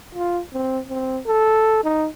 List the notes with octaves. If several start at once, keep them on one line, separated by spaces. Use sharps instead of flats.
F4
C4
C4
A4
D#4